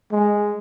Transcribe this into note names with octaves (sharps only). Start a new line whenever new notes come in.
G#3